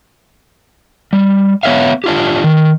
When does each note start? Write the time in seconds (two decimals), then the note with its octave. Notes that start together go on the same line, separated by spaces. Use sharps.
1.13 G3
1.63 B3 C#5 E5 F5
2.04 D4 F4 G4
2.44 D#3